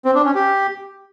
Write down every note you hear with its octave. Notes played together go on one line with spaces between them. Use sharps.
C4
D4
C#4
G4